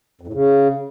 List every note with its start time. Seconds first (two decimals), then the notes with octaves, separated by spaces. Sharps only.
0.21 F2
0.27 A2
0.34 C#3